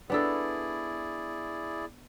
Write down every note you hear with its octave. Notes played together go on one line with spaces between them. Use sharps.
B3 D4 E4 G#4 A4 D5